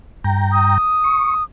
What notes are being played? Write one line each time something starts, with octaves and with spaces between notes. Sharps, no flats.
G2 G5 A#5
D#6
C#6